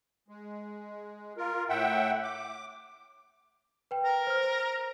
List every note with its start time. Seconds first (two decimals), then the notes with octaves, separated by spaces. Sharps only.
0.28 G#3
1.37 F4 A#4
1.69 A2 E5 F#5 G5
2.23 D6
3.91 B4 G5
4.05 A#4
4.27 C5 F6